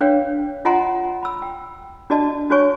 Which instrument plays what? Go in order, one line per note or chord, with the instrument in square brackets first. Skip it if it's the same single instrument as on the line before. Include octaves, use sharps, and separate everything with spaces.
[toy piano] D4 B4 C#5 F5 G5
F4 D#5 F#5 G#5 A#5 C6
B5 E6
G5
D4 F#4 D5 D#5 A5
D4 F#4 C5 C#5 G#5 C#6